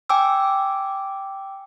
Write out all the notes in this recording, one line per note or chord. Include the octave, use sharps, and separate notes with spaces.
G5 G#5 D6 E6